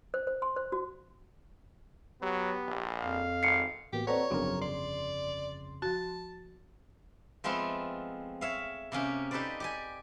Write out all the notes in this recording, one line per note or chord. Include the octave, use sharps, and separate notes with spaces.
C5
C5
C6
C5
F#4
F#3 B3 G4
A#1
F2 F5
G#1 C7 C#7
A1 A#3 B3 F#4 G4
C4 A4 B4 C#5 D5 F#5 A#5 C#6
G1 F2 C#3 F#3 B3 C4 D4 A#4
D5 C6
F3 F#4 A5
F3 G#3 A3 B3 C4 F4
C#5 E5 F5
C3 A#3 C#4 G4
D#4 G4 A4 B4 C5 D5
G4 D5 G#5